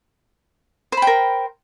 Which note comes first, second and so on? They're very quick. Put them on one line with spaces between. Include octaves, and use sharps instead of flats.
C5 B5 G5 A#4